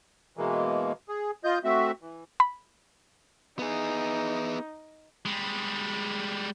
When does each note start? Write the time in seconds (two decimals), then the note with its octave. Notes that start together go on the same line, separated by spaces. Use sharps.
0.37 B2 E3 G#3 A#3
1.09 G#4
1.44 F4 D#5 G6
1.64 A3 C4 F#4 E5
2.02 E3
2.40 B5
3.59 B3 D#4 G#4
5.25 G3 G#3